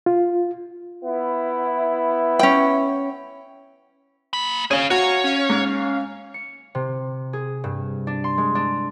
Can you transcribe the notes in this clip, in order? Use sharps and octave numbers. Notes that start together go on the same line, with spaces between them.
F4
B3 E4
C#4 G5
A#3 B5
C#4 G#4 F5
F#4 C#5 F5 G#5 A#5
C#4 F5
G#2
C#7
C3
G#4
G2
D4
C6
G#3
D4